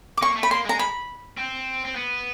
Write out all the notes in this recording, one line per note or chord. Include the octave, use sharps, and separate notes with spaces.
D6
A#3 C#6
A3
B5
A#3 C6
G#3 A#5
B5
C4
C4
B3